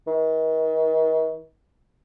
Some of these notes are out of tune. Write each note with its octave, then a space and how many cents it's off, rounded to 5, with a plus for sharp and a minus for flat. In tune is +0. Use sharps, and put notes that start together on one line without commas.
D#3 +40